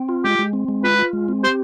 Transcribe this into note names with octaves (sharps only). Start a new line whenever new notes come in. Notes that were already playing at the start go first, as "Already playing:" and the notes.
Already playing: C4
F4
G#3 G4
G#3
C4
G#3
F4 B4
F4
G#3
C4
G4 C5